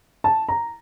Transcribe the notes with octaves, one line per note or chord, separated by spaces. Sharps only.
A5
A#5